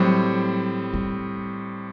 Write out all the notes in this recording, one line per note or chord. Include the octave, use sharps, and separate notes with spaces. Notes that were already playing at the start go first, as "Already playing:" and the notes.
Already playing: A2 F#3 G3 C4
G3